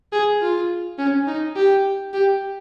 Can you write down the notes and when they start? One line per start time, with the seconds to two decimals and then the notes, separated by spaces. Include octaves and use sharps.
0.12 G#4
0.42 F4
0.99 C#4
1.27 D#4
1.56 G4
2.14 G4